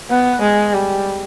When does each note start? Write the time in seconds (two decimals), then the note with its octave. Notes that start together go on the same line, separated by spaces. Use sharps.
0.10 B3
0.42 G#3
0.74 G3